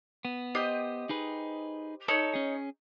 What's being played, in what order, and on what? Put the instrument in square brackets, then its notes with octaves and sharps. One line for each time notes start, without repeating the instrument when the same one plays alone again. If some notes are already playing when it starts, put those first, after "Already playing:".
[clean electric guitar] B3
[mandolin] G4 C5 D#5
[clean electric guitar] D#4 G#4 B4
[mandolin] D#4 C#5 [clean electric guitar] A4
[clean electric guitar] C#4 G#4